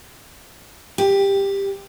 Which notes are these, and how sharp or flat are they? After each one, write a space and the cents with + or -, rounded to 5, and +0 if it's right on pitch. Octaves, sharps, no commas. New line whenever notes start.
G4 +10